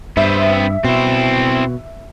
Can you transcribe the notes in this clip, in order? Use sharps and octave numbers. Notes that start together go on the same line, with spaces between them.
G2 B3 C4 E5
B2 C4 E4